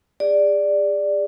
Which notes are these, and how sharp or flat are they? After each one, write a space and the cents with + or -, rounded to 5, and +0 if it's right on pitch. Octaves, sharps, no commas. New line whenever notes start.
G#4 -30 D5 +0